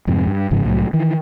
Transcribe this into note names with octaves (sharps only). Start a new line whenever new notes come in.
F2 G#2 C3
G2
G1 G#2 C#3 F3
C2 A2 E3 F#3
D#3 E3